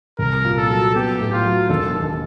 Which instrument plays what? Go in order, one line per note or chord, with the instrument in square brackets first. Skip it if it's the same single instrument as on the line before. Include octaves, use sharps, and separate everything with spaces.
[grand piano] C2 [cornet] A#4
[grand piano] A#2
[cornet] A4
[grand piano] F#3
[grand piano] B3 [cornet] G4
[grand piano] A2
[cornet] F4
[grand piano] F#3
[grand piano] E1 [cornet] A4
[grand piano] D#2